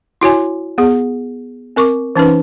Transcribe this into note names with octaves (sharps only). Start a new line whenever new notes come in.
E4 F#4 C#5 G#5
B3 G#4
C4 A#4 C#6 D6
E3 C#4 D#4 B4